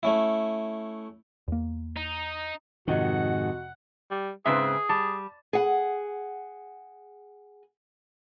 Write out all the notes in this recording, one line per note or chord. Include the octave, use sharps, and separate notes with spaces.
A3 C#4 E4
E2 A#3
D#4
F2 G#2 C3 D#3 F#4 D#5 F#5
G3
G#2 C#3 C4 G#4 B4 E5
G3 A5
G#4 F#5